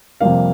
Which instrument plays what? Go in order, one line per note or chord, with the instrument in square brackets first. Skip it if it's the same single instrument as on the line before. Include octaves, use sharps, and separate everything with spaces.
[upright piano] F2 C3 G3 A#3 F5